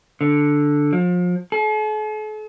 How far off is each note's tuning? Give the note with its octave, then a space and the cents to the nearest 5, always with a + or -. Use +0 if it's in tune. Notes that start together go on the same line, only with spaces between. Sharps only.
D3 +0
F3 +35
A4 -45